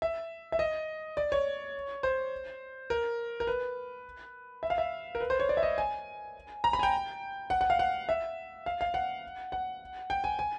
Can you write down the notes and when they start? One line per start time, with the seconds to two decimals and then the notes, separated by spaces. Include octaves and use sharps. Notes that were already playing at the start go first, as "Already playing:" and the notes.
0.02 E5
0.52 E5
0.59 D#5
1.17 D5
1.32 C#5
2.03 C5
2.90 A#4
3.40 A#4
3.47 B4
4.63 E5
4.70 F5
4.78 E5
5.15 A#4
5.20 B4
5.30 C5
5.40 C#5
5.49 D5
5.57 E5
5.63 D#5
5.78 G#5
6.64 A#5
6.73 B5
6.79 G#5
6.83 G5
7.50 F#5
7.61 F#5
7.70 F5
7.79 F#5
8.09 E5
8.66 F5
8.81 F5
8.94 F#5
9.52 F#5
10.10 G5
10.24 G#5
10.39 G#5